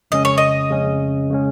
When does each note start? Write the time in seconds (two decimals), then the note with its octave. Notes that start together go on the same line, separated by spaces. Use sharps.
0.11 F2 C#3 G#3 C#4 D#5
0.25 C#5
0.38 D#5
0.71 F2 C#3 G#3 C#4
1.31 C#3 G#3 C#4